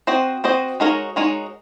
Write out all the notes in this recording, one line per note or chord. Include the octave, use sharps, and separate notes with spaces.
C4 F#4 C5 D#5
C4 F#4 C5 D#5
G#3 D#4 F#4 A#4 C#5
G#3 D#4 F#4 A#4 C#5